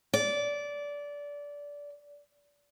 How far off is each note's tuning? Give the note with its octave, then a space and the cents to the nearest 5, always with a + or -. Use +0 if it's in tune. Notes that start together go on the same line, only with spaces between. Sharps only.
D5 -20